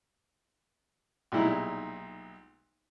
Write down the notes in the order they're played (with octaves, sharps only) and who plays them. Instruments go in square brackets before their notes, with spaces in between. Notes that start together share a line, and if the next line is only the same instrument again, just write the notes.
[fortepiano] B1 A#2 G3 G#3 D#4 E4